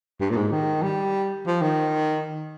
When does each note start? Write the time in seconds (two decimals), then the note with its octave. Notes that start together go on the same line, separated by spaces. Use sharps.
0.20 G2
0.30 A#2
0.36 G#2
0.52 D#3
0.83 G3
1.46 F3
1.62 D#3